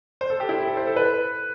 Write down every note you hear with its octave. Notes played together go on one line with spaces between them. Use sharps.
C5
A4
G4
E4
A4
C5
A4
B4